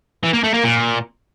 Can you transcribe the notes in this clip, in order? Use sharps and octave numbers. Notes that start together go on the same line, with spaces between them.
E3
A#3
A3
A#3
A#2